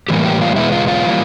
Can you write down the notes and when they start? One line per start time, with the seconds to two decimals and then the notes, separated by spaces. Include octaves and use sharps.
0.09 A2 E3 G3 A#3 G4
0.25 G4
0.41 F4
0.56 E2 B2 G#3 B3 E4
0.72 F4
0.88 F4
1.04 E3 G3 A#3